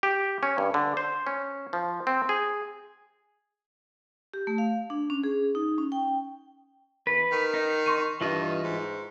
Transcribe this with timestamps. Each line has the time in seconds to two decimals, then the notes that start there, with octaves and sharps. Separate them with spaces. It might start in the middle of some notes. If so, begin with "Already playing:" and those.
0.03 G4
0.43 C#4
0.58 G2
0.74 D3
0.97 C5
1.27 C#4
1.73 F3
2.07 C4
2.29 G#4
4.34 G4
4.47 A3
4.58 F5
4.90 D4
5.10 C#4
5.24 G#4
5.55 D#4
5.78 C#4
5.92 G5
7.07 E2 B4
7.31 D#3
7.54 D#4
7.86 C6 C#6 D#7
8.21 G2 E3 F4 D#5
8.64 G#2